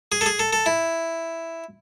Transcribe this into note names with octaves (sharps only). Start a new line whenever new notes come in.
G#4
A4
G#4
A4
A4
E4